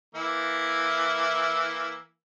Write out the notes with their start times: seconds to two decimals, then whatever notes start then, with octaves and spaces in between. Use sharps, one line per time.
0.15 E3 A#3 E4